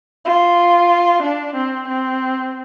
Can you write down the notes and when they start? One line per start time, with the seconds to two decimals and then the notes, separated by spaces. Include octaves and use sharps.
0.25 F4
1.23 D4
1.55 C4
1.88 C4